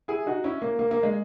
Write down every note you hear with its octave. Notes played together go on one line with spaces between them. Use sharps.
E4 G#4
D#4 F#4
C#4 E4
A#3
A#3
A#3
G#3